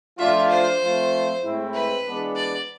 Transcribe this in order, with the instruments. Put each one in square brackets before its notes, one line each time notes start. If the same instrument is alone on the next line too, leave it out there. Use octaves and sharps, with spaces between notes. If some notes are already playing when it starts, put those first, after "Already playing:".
[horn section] F3 A3 D4 F4 [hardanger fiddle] E5
[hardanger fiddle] C5
[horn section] F3 A3 C4 F4
A2 G#3 C4 E4
[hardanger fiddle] B4
[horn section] E3 G#3 B3 D4
[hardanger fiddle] D5